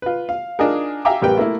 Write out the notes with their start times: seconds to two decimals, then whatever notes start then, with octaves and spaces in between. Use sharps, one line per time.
0.02 F4 B4
0.29 F5
0.59 D4 D#4 F4 G#4 A#4
1.05 E5 F5 G5 G#5 A#5 D6
1.22 A1 G3 G4 A#4 B4 G5
1.37 A3 A#3 E4